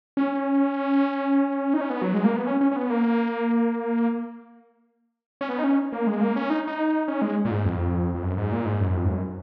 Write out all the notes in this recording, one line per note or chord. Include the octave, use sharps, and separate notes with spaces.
C#4
D#4
C#4
B3
F#3
G#3
A#3
B3
C#4
C#4
C#4
B3
A#3
C#4
B3
D#4
C#4
A#3
G#3
A#3
C#4
D#4
D#4
C#4
G#3
A#2
G#2
F2
F2
F#2
G#2
A#2
G#2
F#2
F2
G#2
F#2